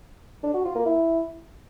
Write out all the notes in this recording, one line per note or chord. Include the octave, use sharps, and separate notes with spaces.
D4
F#4
F4
A#3
E4